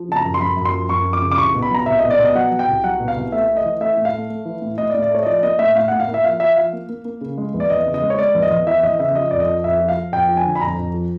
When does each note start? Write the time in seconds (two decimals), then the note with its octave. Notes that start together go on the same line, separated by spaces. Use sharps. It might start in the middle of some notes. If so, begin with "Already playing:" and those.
Already playing: F3
0.08 C#3 A5
0.16 A#5
0.25 F#2
0.34 C6
0.41 F#2 B5
0.57 F#2
0.65 C6
0.73 F3
0.89 F#2 C#6
1.05 F3
1.13 D6
1.22 C#3
1.32 D6
1.38 C2 C#6
1.55 B2
1.62 B5
1.70 F#3 A#5
1.86 C2 E5
1.99 B2 D#5
2.10 D5
2.19 B2 D#5
2.35 F#3 F#5
2.51 F#3
2.59 G5
2.68 C2
2.84 F#3 F#5
3.00 B2
3.08 F5
3.16 C2
3.32 A3 E5
3.49 A3
3.57 D#5
3.65 E3
3.80 A3 E5
3.97 A2
4.05 F5
4.13 A3
4.30 A3
4.45 E3
4.62 A2
4.78 A2 D#5
4.90 D5
4.94 A2
5.02 D5
5.10 A3 C#5
5.23 D#5
5.26 F3 D5
5.43 A#3 D#5
5.59 A2 E5
5.75 A2 F5
5.88 A2 F#5
6.00 F5
6.07 A#3
6.14 E5
6.24 F3 F5
6.40 F3 E5
6.56 F3 F5
6.73 A#3
6.89 A#3
7.05 A#3
7.21 C#3
7.38 G#3
7.54 E2
7.60 D5
7.70 E2 D#5
7.85 C#3
7.94 D#5
8.02 G#3
8.10 C#5
8.18 G#3 D5
8.34 E2
8.42 D#5
8.51 E2
8.67 E3 E5
8.83 E2 D#5
8.99 C#3 E5
9.15 F3 D#5
9.31 F2 D5
9.40 D#5
9.48 F3
9.64 F2 E5
9.80 F3
9.89 F5
9.96 F3
10.12 F2 G5
10.29 F3
10.37 G#5
10.45 D3
10.55 B5
10.61 F2 A#5
10.78 F2
10.94 F3